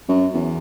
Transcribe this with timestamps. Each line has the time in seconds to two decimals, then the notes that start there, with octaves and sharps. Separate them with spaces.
0.09 F#2
0.35 E2